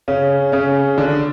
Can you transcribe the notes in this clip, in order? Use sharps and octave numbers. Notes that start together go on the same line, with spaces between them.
C#3 C#4
C#3 C#4
D3 D4